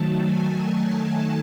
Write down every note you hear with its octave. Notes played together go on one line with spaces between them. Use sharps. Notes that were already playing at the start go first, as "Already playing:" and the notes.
Already playing: D#3 F#3 A3 A5
G#5
G#5